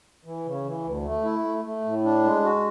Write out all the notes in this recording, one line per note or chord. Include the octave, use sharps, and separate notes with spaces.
E3
C#3
E3
D2
A3
E4
A3
A3
A2
D4
G#3
F#4